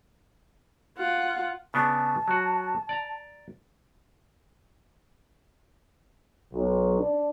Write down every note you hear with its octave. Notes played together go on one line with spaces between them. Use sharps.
F4 F#5
C#3 B3 D4 A5
F#3 F#4
D5 A#5
B1
D4